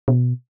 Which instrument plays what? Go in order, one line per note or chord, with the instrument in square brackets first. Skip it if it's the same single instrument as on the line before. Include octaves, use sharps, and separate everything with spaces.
[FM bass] B2